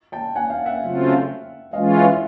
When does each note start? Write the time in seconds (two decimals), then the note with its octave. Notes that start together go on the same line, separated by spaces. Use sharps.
0.12 G5 A5
0.35 F#5 G#5
0.50 F5 G5
0.66 E5 F#5
0.81 C#3 F#3 A3 C4 F4
1.73 E3 G#3 C#4 F4 D#5 F5
1.95 E5 F#5